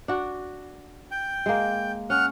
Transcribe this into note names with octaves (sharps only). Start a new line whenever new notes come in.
D4 F#4
G5
G#3 A#3
C#4 F#5 F6